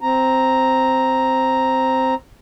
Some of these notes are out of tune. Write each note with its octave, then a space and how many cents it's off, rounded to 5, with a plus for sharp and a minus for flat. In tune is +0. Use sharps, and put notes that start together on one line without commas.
C4 +0 A#5 +0